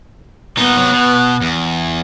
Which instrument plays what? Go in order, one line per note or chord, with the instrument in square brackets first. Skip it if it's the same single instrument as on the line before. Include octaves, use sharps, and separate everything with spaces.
[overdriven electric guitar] A#2 D#4 [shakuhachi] B3
[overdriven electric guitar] C3 F#3
B2
E2